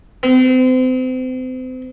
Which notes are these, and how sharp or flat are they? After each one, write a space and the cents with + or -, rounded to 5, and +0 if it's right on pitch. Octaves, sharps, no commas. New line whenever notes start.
C4 -35